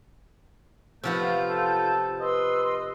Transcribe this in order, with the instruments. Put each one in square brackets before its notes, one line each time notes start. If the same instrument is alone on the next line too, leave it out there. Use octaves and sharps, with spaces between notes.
[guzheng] C3 F3 B3 [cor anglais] A3 [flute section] F4 G6
[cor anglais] A4
[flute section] B4 C6 E6 [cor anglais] D#5